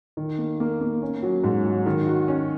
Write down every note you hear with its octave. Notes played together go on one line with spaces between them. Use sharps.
D#3
A#3
A#3
A#3
C#4
F#3
G#2
F#3
D#3
F#4
C#4